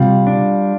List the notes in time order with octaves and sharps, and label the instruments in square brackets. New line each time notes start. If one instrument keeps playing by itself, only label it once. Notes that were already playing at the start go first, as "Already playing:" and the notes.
Already playing: [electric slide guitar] C3 G3 [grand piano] F4 F5
[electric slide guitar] D4